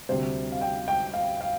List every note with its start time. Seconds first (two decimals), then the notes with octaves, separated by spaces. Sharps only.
0.09 D2 C3 G3 C5
0.52 F5
0.61 G5
0.88 G5
1.14 F5
1.41 F5